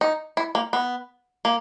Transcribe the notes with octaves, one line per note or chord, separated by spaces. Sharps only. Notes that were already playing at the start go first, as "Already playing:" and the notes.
D#4
E4
A#3
B3
A#3